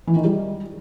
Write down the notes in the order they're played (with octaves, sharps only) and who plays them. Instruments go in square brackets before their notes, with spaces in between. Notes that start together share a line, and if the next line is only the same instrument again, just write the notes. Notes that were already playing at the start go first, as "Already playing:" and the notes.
[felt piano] E3
D#3
G3